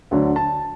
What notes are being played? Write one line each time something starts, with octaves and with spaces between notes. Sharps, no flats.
D2 D3 F#3
A5